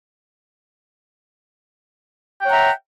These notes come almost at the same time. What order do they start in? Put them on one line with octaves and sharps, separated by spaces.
G5 C#5 F#5 A#5 E5